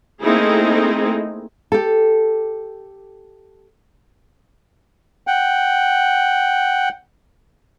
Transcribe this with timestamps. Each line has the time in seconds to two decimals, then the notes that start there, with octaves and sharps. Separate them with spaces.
0.22 A3 A#3 C4 D#4 E4 G#4
1.72 G4 A4
5.27 F#5 G5